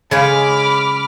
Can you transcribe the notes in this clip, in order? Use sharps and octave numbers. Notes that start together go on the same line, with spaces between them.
C#3 G#3 C#5 B5 D6 F6